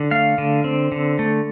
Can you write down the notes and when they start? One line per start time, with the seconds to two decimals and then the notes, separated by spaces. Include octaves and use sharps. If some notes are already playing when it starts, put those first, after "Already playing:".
Already playing: D3
0.11 A3 F5
0.38 D3
0.64 C4
0.92 D3
1.19 A3